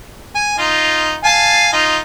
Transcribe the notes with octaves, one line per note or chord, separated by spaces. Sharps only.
G#5
D#4 F4
F5 G#5 A5
D#4 F4